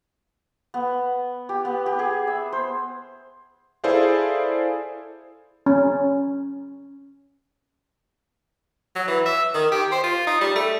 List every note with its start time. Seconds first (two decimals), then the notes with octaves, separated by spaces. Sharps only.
0.74 B3
1.49 G4
1.65 B3
1.86 G4
1.99 G#4
2.27 E5
2.52 C5
3.84 E4 G#4 A4 C5 D5 F5
5.66 C#4
8.95 F#3
9.08 E3
9.26 E5
9.54 D#3
9.72 G4
9.92 C5
10.04 F4
10.27 D#4
10.41 G3
10.56 A3